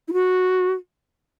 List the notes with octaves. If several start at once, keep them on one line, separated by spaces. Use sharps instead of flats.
E4
F#4